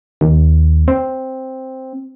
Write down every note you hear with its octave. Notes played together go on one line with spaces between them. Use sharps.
D#2
C4